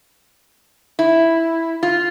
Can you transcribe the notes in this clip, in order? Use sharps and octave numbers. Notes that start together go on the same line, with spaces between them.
E4
F4